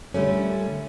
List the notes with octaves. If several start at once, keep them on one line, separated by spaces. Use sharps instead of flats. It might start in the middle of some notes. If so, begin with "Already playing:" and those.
A#2 D3 G3 A3 C#4